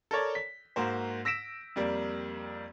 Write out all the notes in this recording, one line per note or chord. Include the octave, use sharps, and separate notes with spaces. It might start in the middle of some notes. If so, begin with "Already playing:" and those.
A4 A#4 C#5 D5
B6
G#2 A#3 F#4 C5
E6 A#6 B6 D7 E7
F2 G3 A#3